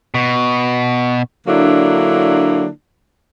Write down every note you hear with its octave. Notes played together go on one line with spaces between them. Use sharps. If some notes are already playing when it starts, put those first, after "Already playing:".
B2
D3 F#3 A#3 D4 E4